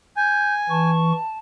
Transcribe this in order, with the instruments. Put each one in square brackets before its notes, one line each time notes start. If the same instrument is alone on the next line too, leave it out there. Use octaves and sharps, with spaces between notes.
[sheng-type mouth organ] G#5 [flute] G6
[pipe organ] E3 C#6 [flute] A5